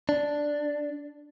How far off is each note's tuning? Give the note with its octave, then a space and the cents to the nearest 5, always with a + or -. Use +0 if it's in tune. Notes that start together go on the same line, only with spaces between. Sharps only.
D4 +0